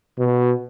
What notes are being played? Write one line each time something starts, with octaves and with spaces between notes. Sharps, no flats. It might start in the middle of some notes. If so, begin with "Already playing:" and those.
B2